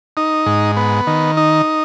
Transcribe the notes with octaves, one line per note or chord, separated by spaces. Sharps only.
D#4
G#2
B3
D#3
D#4